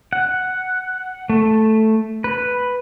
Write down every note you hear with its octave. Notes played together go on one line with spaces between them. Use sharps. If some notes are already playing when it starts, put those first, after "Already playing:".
F#5
A3
B4